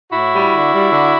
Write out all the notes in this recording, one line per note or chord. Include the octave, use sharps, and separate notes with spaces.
A2 E4 F#4
G3
D3
G3
D3